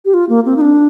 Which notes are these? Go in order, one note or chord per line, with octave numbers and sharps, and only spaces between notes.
G4
F4
A#3
C4
D#4
D4